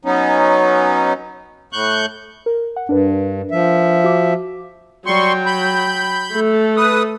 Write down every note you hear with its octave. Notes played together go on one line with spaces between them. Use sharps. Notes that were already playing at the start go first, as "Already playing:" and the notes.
F#3 B3 C#4 D#4
A2 C#6 F#6 G6
A#4
F#5
G2 D4 A#4 B4
F3 E5
F#4 D6
F#3 G3 G5 C6 C#6
B5 G6
A3 A4
B4 D#6